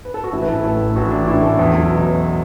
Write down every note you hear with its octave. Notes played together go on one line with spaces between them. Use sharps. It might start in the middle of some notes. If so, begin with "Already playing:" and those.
B4
A4
F#4
A1 E4
B4
E3 A4
A2 A4
A1
A1 F#4
E3 D4
A2 E4
A1 A4
E2
F#3
B2
E2